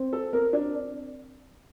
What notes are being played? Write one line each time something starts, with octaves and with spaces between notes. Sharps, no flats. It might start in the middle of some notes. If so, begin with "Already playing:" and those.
Already playing: C4
A4
C4 A#4
D4